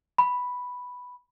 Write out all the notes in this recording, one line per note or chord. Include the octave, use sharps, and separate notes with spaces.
B5